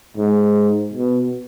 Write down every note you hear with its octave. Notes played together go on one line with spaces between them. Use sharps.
G#2
B2